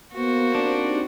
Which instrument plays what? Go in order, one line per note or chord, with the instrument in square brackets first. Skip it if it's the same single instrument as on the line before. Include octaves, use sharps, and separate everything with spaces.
[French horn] A#3 [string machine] B3 [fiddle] F#4 C5
[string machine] C4 D#4 G4 [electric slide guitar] D4